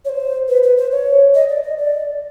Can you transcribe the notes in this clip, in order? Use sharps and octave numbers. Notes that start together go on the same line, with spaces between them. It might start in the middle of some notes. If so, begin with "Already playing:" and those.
C#5
C5
B4
B4
C5
C#5
D#5
D5
D#5
D5